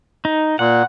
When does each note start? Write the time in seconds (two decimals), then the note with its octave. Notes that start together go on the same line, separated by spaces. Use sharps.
0.25 D#4
0.59 A#2 F#5